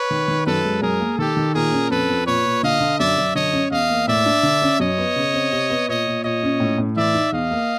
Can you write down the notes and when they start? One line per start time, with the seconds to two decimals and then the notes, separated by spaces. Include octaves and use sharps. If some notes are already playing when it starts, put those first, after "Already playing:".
Already playing: B4 C#5
0.11 D#3
0.28 D#3
0.46 F#2 A4 B4
0.65 G#3
0.82 F#2 G#4 A#4
1.00 A#3
1.18 D#3 G4 A4
1.37 D#3
1.54 A#2 G#4 A#4
1.72 C#4
1.90 F2 A4 B4
2.09 F2
2.27 A#2 B4 C#5
2.45 A#2
2.63 D3 D#5 F5
2.80 D3
2.99 F#2 D5 E5
3.17 F#2
3.35 D3 C#5 D#5
3.53 C#4
3.71 E2 D#5 F5
3.90 A#3
4.07 A2 D5 E5
4.26 D4
4.43 D3
4.62 C#4
4.80 F#2 C#5 D#5
4.98 B3
5.16 C#3
5.34 C4
5.52 C3
5.70 B3
5.88 A#2 C#5 D#5
6.07 A#2
6.24 A#2 C#5 D#5
6.43 C#4
6.60 A2
6.78 A2
6.97 E3 D5 E5
7.14 D#4
7.32 E2 D#5 F5
7.51 A#3